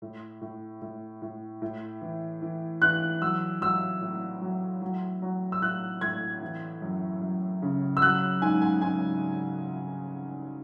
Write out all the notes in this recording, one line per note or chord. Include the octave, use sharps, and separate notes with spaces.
A2
A2
A2
A2
A2
E3
E3
E3 F#6
F#3 E6
F#3 E6
A2
F#3
F#3
F#3
E6
A2 F#6
A2 G#6
E3
F#2
F#2
C#3
E6
F#3 F#6
G#2 G#5
G#5
G#2 G#5